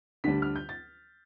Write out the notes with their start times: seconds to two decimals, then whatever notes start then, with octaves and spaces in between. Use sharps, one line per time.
0.24 D2 D3 G3 D4 B6
0.42 F6
0.56 G6
0.69 A6